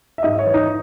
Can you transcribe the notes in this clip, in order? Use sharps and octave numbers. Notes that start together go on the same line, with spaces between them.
E5
G#2 D#5
C#5
E3
D#4